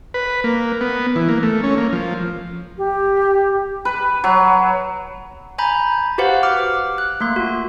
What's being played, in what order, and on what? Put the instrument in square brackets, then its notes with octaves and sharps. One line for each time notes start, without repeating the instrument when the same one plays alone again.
[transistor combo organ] B4
A#3
B3
E3
A#3
A3
C#4
A#3
F3
[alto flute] G4
[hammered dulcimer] B4
F#3
[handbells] G#5 A#5 B5 G6
F#4 G4 B4 C5 F5 F#5
D6 F6
F#6
A3 A#3 C6
F4 F#4